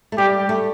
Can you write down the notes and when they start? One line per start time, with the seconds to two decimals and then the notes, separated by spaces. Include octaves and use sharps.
0.12 A3
0.18 G3 G4
0.49 A3